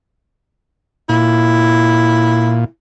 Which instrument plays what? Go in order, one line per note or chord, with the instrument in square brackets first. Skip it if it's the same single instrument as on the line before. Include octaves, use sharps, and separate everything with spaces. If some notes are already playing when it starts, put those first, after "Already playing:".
[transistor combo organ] A#2 [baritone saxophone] E4